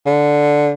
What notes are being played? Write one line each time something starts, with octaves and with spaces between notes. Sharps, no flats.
D3